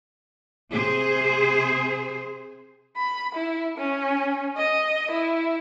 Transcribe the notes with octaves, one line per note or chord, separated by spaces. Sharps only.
C3 G#4 C5
B5
E4
C#4
D#5
E4